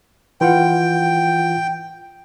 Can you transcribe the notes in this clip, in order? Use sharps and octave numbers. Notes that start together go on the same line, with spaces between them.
E3 F4 F#5 G5